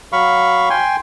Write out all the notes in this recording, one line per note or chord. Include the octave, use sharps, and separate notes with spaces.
F#3 F5 B5 C#6
G5 G#5 C6